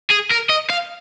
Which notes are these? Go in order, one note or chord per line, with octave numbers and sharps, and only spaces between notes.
G#4
A#4
D#5
F5